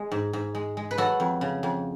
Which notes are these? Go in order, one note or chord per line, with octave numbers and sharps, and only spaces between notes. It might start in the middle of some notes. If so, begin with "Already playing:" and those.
Already playing: G#3
G#2
G#2
G#3
G#3
B4
F#3 F#4 A4
F2
C#3
F2